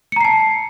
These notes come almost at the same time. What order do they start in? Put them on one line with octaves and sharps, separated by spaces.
C#7 A#5 C7 A5